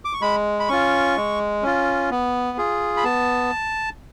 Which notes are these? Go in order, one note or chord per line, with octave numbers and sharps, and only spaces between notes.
D6
C#6
G#3 B5
B5
C#4 F4 C#6
G#3
C#4 F4
B3
F4 G#4
B5
B3 A5